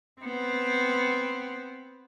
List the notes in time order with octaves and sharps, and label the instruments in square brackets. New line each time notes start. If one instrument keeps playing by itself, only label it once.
[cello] B3 C4